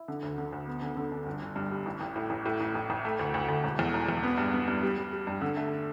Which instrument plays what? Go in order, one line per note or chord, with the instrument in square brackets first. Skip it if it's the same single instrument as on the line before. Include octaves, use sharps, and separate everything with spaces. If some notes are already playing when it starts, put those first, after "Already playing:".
Already playing: [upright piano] E4
D3
D2
D3
D2
B3
D3
D3
D4
G1
G1
G2
G3
A1
A1
A2
A1
A2
A1
A1
A1
A3
D2
D2
D2
E1
E2
E1
E2
B3
G2
B3
G2
G3
G3
G3
G2
D3
A3